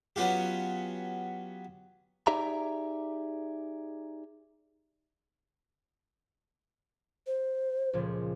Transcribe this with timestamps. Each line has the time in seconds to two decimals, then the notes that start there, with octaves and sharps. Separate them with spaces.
0.16 F#3 B3 C#4 F4 G4
2.27 D#4 G4 G#4 D5 E5 A#5
7.27 C5
7.93 C#2 A#2 F3